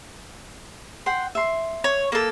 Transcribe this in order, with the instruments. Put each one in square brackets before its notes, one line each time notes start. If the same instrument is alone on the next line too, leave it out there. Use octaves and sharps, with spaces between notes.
[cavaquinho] F#5 G5 C6
E5 C6
[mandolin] C#5
A#3 A4